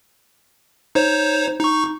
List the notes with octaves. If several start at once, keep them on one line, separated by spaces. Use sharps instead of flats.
D#4 C5 C#5
D#4 C#6